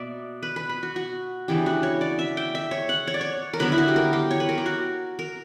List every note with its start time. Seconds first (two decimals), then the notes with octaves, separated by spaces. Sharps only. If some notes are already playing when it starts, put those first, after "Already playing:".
Already playing: B2 A#3 D5 E5
0.43 B4
0.56 B4
0.69 B4
0.83 F#4
0.96 F#4
1.48 C#3 E3 B3 D4 G4
1.66 F#4
1.83 C#5
2.01 D5
2.19 E5
2.37 G5
2.55 E5
2.71 C#5
2.89 F#5
3.07 C#5
3.14 D5
3.21 C#5
3.53 A#4
3.59 D3 F#3 B3 D4 B4
3.72 E4
3.78 F#4
3.88 G4
3.96 A#4
4.13 G4
4.31 C#5
4.40 B4
4.49 A#4
4.58 G4
4.66 F#4
5.19 A#4